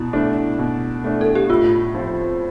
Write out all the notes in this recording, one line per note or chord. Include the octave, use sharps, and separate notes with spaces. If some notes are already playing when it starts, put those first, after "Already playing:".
Already playing: B2 E4
A3 D4
B2
A3 D4
A4
G4
A2 F4
F3 C4